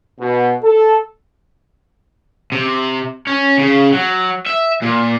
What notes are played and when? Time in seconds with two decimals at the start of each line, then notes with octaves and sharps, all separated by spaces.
0.20 B2
0.63 A4
2.52 C3
3.27 C#4
3.58 C#3
3.93 F#3
4.47 E5
4.82 A#2